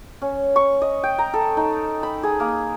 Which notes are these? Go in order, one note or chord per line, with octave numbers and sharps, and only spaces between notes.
C#4
C#6
D#5
G5
A#5
A4
D#4
B5
G#4
A#3